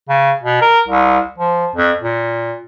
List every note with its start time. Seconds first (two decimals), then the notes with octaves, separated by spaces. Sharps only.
0.09 C#3
0.43 B2
0.62 A#4
0.88 C2
1.38 F3
1.76 F2
2.02 A#2